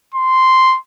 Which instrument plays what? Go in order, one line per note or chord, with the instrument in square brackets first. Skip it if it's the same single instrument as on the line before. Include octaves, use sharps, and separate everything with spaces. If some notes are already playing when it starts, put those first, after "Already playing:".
[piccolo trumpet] C6